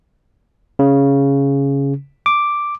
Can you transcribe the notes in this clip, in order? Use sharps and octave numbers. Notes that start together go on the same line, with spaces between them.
C#3
D6